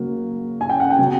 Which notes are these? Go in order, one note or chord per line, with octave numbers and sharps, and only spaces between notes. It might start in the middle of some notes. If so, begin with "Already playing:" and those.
Already playing: C#3 F#3 A#3
G#5
G5
F#5
G5
C#3 F#3 B3